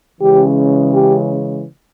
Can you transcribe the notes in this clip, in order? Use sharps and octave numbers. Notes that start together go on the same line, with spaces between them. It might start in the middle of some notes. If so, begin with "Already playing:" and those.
C#3 E3 G#3 C#4 G4
G4